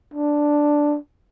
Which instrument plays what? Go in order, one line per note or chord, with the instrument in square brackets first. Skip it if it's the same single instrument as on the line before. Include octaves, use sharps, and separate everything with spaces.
[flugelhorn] D4